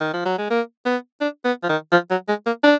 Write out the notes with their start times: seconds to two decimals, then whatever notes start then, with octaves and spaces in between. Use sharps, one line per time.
0.00 D#3
0.13 F3
0.26 F#3
0.38 G#3
0.50 A#3
0.86 B3
1.21 D4
1.45 B3
1.63 F3
1.69 D#3
1.92 F3
2.11 F#3
2.28 G#3
2.46 A#3
2.64 D4